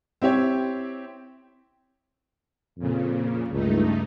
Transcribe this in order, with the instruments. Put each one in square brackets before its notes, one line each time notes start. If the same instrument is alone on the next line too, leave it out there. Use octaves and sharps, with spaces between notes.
[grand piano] C4 E4 G4 C#5
[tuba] F2 [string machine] A#2 C#3
[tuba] C#2 [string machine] G2 A3 D#4